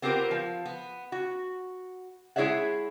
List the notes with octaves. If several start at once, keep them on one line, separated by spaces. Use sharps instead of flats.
B3 C4 F4 G4 A#4 C5
F3
B3
F#4
G#3 E4 G#4 C#5 E5 F#5